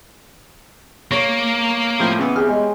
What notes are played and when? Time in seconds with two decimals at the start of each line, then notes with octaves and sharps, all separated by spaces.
1.11 A#3 C#5
2.00 A2 F3 G5
2.18 C#3 E3 B3
2.36 E2 G4 G#4 F6
2.49 G#3